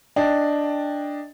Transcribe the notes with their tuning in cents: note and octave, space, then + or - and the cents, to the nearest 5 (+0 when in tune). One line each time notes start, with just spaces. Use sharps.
D4 +0 D#5 +0 G5 +15